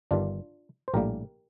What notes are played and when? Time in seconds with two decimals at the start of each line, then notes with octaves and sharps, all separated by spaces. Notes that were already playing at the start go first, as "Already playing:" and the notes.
0.11 G1 G2 D#3 D4 F4
0.88 C5
0.94 A#1 A2 G3 A#3 G4 A#4